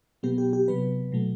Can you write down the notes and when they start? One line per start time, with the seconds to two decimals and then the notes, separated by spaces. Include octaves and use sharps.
0.23 B2 F#3 B3 G4
0.38 G4
0.53 G4
0.68 C3 F#3 B3 B4
1.12 B2 F#3 A3